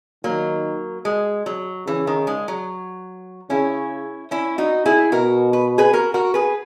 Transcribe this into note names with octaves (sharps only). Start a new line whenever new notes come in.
D#3 F#3 A#3
G#3
F#3
C#3 E3
D#3
G#3
F#3
C#3 C#4 E4
C#4 E4
D#4 F#4
E4 G#4
B2 F#4 A#4
B4
G#4 B4
F#4 A#4
F#4 A#4
G#4 B4